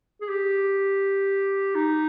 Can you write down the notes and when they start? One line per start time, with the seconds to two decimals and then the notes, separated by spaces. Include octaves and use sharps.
0.21 G#4
0.29 G4
1.75 D#4